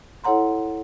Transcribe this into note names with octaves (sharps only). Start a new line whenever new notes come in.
E4 A4 C#5 F#5 A#5 C6